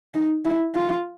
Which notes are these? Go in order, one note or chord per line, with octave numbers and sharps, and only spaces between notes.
D#4
E4
F4